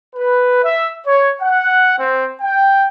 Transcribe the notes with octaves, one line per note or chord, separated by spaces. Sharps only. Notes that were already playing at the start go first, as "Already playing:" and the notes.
B4
E5
C#5
F#5
C4
G5